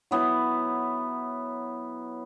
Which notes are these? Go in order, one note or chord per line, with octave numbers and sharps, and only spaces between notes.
F#3 B3 E4